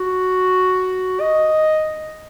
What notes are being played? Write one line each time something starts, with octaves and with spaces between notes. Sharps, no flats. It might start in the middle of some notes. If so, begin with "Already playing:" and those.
Already playing: F#4
D#5